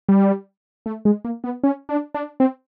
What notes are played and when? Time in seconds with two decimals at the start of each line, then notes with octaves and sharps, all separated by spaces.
0.09 G3
0.86 A3
1.05 G#3
1.25 A#3
1.44 B3
1.64 C#4
1.89 D4
2.14 D4
2.40 C4